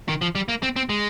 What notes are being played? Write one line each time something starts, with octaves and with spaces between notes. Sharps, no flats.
D#3
F3
G3
A#3
C4
C4
G#3